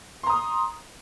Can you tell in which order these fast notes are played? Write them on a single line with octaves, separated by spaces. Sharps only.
C6 A#5 D#6